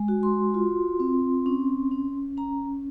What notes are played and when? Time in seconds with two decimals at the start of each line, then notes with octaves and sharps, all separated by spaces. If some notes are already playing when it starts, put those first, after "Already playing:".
Already playing: G#3
0.08 F#4
0.23 C6
0.54 F4
1.00 C4
1.46 C#4
1.91 C#4
2.37 C#4 A#5